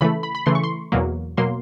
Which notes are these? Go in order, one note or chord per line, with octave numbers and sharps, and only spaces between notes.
C#3 E3 A3 B5
B5
B5
C#3 E3 A3 C6
C#6
C6
E2 B2 F#3 A#3
B2 F#3 A#3 C6